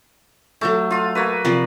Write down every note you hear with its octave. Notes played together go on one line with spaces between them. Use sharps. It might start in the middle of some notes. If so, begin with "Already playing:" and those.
F#3 A3 A4 D6
F4 F5
A#3 F#4 B4
C3 F3 D5